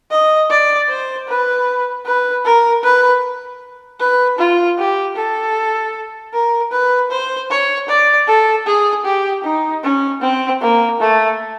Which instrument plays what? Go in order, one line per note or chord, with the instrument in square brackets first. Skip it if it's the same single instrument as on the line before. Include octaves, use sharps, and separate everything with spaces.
[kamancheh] D#5
D5
C5
B4
B4
A#4
B4
B4
F4
G4
A4
A#4
B4
C5
C#5
D5
A4
G#4
G4
D#4
C#4
C4
A#3
A3